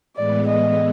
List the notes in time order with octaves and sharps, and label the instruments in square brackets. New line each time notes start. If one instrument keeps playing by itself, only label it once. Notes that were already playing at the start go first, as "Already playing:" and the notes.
[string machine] A2 E3 G#3 B3 [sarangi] D5
[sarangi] D#5